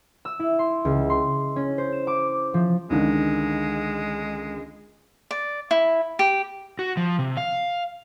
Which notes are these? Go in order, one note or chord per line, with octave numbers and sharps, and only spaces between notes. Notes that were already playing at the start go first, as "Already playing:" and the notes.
E6
E4
C6
C#2
C6
C#4
C5
E7
D6
F3
C#2 D3 D#3 G#3
D5
E4
G4
F#4
F3
C3
F5